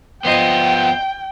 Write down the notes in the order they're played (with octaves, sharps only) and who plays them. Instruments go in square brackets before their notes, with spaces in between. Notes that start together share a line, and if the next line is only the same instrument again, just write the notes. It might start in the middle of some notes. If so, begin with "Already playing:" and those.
[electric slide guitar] F2 C5 D#5 [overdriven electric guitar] B3 F4 [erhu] G5